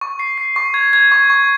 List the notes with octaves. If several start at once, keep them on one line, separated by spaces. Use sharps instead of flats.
C#6
C7
C7
C#6
G#6
G#6
C#6
C#6